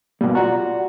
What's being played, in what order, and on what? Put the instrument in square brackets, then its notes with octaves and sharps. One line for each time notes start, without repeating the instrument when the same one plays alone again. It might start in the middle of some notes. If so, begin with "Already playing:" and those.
[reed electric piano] B2 G3 [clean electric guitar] A#3
[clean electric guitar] F4 D5 A#5 [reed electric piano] F#4 F#5